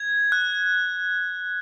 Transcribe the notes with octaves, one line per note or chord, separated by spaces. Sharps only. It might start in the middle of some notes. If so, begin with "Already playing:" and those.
Already playing: G#6
F#6